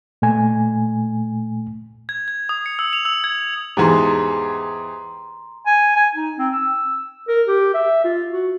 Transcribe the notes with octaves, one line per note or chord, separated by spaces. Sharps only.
A#2 A3 G#5
G#6
G#6
D#6
C#7
E6
F7
E6
G#6
E2 G#2 G4 G#4 A#5 C6
G#5
G#5
D#4
C4
E6
A#4
G4
E5
F4
F#4